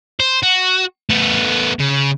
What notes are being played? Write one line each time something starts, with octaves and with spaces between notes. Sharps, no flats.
C5
F#4
A3 B3
C#3